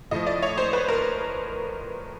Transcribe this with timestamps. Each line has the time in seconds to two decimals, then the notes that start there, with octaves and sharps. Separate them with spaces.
0.11 A2 F3 D#5
0.27 D5
0.42 C#5
0.57 C5
0.73 B4
0.88 A#4